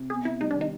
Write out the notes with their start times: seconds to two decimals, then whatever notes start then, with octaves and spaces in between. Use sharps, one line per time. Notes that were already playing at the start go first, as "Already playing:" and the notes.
Already playing: C3
0.10 B3 G#4
0.25 C3 E4
0.41 G3 D#4
0.51 D4
0.55 D#3
0.61 D#4